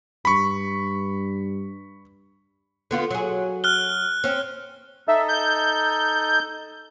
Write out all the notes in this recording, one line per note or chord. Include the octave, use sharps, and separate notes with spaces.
G2 B5 C#6
D3 B3 F4
F#3 G#4
F6 F#6 G7
C4 C#4
D#4 A4 E5
G6